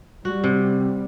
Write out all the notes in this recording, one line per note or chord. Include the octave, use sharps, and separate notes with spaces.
G3 F#4
C3